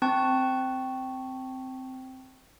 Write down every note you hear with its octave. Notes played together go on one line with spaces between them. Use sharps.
C4 A5 C#6